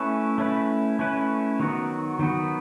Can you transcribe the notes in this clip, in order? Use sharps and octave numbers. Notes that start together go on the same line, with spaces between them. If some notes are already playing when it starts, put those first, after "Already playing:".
Already playing: A3 C#4 E4 B4
A3 C#4 E4 B4
A3 C#4 E4 B4
D#3 F#3 B3 F#4
D#3 F#3 B3 F#4